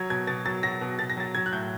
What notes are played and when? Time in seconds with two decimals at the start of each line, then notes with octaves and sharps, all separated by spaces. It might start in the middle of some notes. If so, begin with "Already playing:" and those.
Already playing: F#3 G#6
0.10 B2 G#6
0.27 B2 A6
0.45 F#3 A6
0.63 F#3 A#6
0.81 B2
0.99 B2 A6
1.10 A#6
1.17 F#3 A6
1.35 F#3 G#6
1.46 F#6
1.53 A2 G6